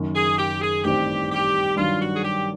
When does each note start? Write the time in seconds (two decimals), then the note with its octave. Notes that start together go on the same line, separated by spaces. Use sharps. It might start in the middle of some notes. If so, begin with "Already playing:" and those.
Already playing: F#1 F#2 D#3
0.15 G#4
0.38 G4
0.61 G#4
0.84 A1 G2 D#3 G3 C4 G4
1.31 G4
1.76 G2 D#3 F#3 F4
2.00 F#4
2.15 G#4
2.23 G4